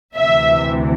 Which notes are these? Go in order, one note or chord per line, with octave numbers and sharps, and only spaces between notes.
D2 C3 E3 E5